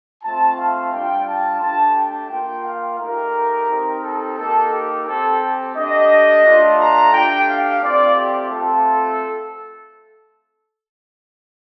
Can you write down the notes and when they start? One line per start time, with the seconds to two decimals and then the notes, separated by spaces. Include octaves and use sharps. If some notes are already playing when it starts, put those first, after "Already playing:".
0.23 A3 C4 F4 A5
0.58 F5
0.92 G3 D4 F4 G5
1.27 A5
1.61 A3 D4 G4 A5
1.95 G5
2.30 A#3 F4 G5
2.65 F5
2.99 A3 D#4 G4 A#4
3.69 C4 D#4 G4
4.03 A4
4.37 A#3 D#4 G4 A4
4.72 G4
5.06 C4 G4 A4
5.75 A3 D4 G4 D#5
6.45 A3 D4 F4
6.79 A#5
7.13 A3 D4 G4 G5
7.48 F5
7.82 A3 C4 F4 D5
8.17 G4
8.51 A3 C4 F4 A4